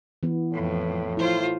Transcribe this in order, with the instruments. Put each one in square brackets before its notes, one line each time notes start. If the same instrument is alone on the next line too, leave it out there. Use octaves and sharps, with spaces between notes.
[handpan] E3 B3
[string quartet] F2 [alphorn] A2
[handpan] E4 [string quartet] F4 C5